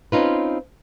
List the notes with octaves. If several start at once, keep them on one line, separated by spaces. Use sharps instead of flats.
C4 C#4 D#4 F4 B4